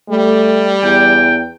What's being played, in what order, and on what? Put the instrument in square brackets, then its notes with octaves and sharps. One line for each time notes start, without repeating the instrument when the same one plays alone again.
[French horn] G3 [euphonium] A3
[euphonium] E2 [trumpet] G5